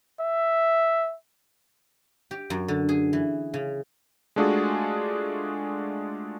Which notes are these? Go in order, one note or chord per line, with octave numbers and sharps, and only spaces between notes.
E5
G4
F#2
D3
G#4
E3
C#3
G#3 A3 D4 F4 F#4 G#4